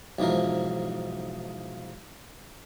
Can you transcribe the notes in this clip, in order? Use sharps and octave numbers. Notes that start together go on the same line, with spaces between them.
B1 G#2 E3 F3 A#4